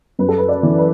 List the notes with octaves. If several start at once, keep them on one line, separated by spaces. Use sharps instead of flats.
F#2 B4
A4
B4
D5
E3
B4